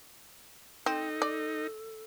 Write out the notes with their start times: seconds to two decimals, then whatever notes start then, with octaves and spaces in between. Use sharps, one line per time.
0.86 C4 D#4 A4
1.22 D5